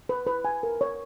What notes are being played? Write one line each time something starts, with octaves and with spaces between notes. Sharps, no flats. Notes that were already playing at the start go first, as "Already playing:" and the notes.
B4
B4
G#5
A#4
C#5